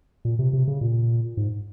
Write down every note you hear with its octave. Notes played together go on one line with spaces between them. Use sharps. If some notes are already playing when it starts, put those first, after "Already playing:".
A#2
C3
C3
C#3
A#2
G#2